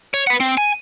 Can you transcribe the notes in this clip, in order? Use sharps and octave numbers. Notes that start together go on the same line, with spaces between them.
C#5
B4 F#5
C4
G#5